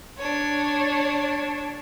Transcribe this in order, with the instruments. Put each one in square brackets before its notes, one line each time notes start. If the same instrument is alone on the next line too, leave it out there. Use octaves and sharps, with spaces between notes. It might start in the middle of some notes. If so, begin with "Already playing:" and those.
[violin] D4 C#5